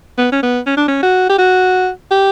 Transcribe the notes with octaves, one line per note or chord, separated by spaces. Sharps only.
B3
C#4
B3
C#4
D4
C#4
F#4
G4
F#4
G4